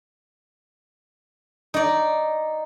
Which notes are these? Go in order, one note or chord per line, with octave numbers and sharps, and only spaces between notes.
D#4 D5